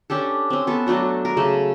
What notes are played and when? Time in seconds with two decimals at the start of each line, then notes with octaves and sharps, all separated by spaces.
0.10 C#4 D4 G4 A4
0.50 C4 C#4
0.67 B3 A4
0.87 F#3 A3 D4 F#4
1.25 A#4
1.37 C#3 A3